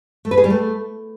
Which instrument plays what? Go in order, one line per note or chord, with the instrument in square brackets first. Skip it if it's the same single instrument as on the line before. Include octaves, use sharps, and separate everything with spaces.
[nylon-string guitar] A3
B4
G#4
G3
A3